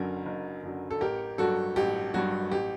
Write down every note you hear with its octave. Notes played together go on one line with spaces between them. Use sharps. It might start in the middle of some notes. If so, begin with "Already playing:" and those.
Already playing: F#1 F#2 D3 F#3 A#4
F#1
F#2 D3 F#3
A4
A1 G4 A#4
G2 F#3 F#4 A4
A1 G4
G2 F#3 F#4
A1 G4